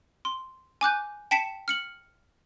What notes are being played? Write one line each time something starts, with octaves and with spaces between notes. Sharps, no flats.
C6
G#5 D6 F#6 G6
G5 A5 B6 C#7 E7
F6 C#7 F#7